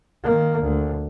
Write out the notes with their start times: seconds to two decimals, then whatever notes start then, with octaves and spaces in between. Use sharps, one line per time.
0.23 D#3 A#3
0.61 D2